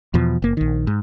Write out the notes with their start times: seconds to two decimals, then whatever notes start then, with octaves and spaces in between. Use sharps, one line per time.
0.14 E2 B2 F3
0.42 F#1 A#3
0.57 A#1 D#3
0.87 G#2